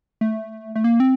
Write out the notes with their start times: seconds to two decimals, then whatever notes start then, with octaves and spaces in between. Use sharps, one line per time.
0.21 A3
0.76 A3
0.84 A#3
1.00 C4